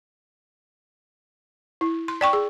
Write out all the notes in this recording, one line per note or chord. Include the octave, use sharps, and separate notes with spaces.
E4
C6
D5 G5 C#6
G#4